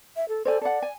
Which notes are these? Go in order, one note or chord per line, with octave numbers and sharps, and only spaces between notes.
E5
A4
A4 C5 D5 G#5
A4 D5 F#5
G#5